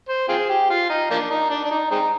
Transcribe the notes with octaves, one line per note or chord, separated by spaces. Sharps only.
C5
C4 F4 G#4
G4
F4
D#4
F3 A#3 D4
D#4
D4
D4
D#4
G#3 C4 D#4